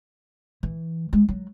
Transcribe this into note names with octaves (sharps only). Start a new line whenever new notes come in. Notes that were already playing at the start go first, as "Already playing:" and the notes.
E3
G#3
F#3